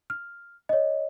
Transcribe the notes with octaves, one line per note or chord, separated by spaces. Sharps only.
F6
C#5 D#5